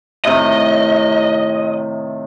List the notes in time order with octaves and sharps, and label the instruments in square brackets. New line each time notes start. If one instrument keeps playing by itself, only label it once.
[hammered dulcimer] A2 C3 D#3 [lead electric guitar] D#5